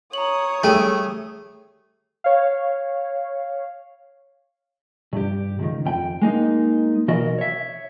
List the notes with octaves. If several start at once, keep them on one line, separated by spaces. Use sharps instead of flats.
C#5 A#5 D#6 F#7
G3 A3 G#4 A4 G5 D#7
C#5 F5
G2 G4
C#2 D#3
F2 G5
G#3 A#3 D#4
B1 E3 F#4 A#4 D#5
C#5 E5